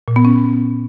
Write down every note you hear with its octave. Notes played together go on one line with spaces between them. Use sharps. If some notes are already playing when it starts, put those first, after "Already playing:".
A#2
B3
C#4